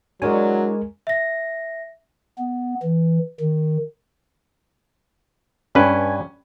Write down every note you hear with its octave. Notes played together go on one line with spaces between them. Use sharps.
F#3 G#3 D4 E4 A#4 C#5 G#5
E5 A#6
B3
E3
D#3
G2 C#4 B4 G#5